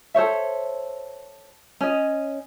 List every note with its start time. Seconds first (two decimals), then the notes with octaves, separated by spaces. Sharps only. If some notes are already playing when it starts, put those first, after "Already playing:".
0.14 A4 C5 C#5 E5
1.81 C#4 D#5